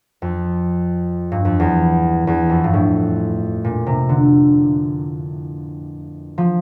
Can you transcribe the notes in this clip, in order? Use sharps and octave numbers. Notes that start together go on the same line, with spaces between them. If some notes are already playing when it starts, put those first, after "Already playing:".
F2
G2
F2
E2
E2
F2
G2
A2
A#2
C3
D3
F3